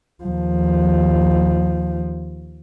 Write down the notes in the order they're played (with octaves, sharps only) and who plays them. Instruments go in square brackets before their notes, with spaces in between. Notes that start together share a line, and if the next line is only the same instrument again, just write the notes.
[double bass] D#2 F3